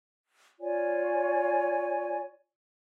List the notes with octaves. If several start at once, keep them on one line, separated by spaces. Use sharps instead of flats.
F4 C#5 D5 G#5